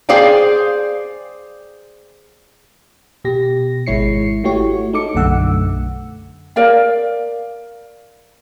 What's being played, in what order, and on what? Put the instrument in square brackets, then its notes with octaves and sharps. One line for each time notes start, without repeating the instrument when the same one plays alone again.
[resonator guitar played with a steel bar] G#4 C5 D5 F5 G5
[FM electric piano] B2 G4 A#6
G#1 G#3 E4 C#5 C7 C#7
A3 E4 F#4 G4 C#5
D#4 A4 D6 C#7
B1 F#2 D3 A3 F#5 E6
[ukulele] A#4 D5 F5